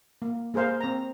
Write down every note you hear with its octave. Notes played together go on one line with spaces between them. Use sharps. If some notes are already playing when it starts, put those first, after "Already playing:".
A#3
A#3 G#4 A#4 C5 F5
C4 A#5